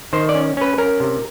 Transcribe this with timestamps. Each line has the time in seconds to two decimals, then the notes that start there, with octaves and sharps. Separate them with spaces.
0.13 D#3 C5
0.29 D5
0.35 C#4
0.57 C#4 B4
0.78 C#4 A#4
1.00 C3